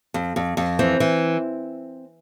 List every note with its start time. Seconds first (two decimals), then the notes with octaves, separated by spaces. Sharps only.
0.14 F2
0.36 F2
0.57 F2
0.79 E3 C4
1.00 E3